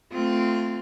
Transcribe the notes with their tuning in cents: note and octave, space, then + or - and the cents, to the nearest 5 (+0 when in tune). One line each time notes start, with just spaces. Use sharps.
A3 +0 C4 -20 F4 +0